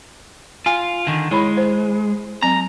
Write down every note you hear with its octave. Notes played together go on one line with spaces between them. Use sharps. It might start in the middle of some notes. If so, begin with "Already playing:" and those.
F4 G#5
D3 D#3
G#3 E4 C#5 B5
C5
F#3 C4 A#5